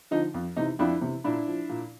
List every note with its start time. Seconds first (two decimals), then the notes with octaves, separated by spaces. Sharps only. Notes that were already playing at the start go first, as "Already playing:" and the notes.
0.11 D3 F3 D#4
0.34 F2
0.57 C3 E3 D#4
0.79 F2 D4 E4
1.01 C3 E3
1.24 A#2 D4 E4
1.47 F3
1.69 A#2